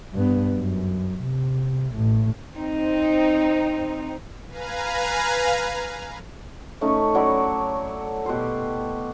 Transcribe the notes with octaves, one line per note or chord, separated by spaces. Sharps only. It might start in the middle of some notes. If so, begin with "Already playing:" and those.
G2 B3
F#2
C3
A1 A2
C4 D#4
B4 F5 G#5 A#5
A3 C#4 D#4
F#3 E4 C#5 D5
B2 G4 C6